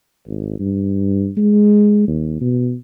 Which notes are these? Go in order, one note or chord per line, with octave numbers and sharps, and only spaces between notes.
G#1
G2
G#3
D#2
B2